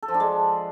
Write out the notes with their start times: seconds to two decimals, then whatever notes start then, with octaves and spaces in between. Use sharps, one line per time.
0.03 A4
0.08 F3
0.14 D4
0.20 G#3